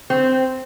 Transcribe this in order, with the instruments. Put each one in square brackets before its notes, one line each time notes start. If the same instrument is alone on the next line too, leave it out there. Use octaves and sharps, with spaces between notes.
[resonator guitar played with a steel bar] C4